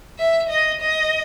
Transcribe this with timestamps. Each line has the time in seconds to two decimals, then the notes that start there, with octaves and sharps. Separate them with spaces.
0.19 E5
0.50 D#5
0.81 D#5